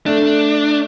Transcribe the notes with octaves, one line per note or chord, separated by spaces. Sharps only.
A3 D4